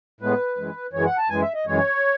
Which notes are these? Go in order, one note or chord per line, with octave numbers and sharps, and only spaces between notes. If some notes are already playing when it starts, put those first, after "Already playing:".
A2 G#3 B3 B4
F#2 E3 G#3
F#2 E3 G#3 C#5
F#5
A5
F#2 E3 G#3 G#5
E5
D#5
F#2 E3 G#3 C#5